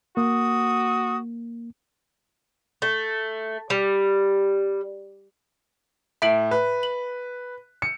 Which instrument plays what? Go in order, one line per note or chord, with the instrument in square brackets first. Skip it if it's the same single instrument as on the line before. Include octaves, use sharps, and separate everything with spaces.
[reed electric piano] A#3 [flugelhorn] F#4 [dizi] D#6
[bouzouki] A3
G3
[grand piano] A2 [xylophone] E5 D7 F#7
[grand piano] B4
[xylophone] F#7
[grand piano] C#7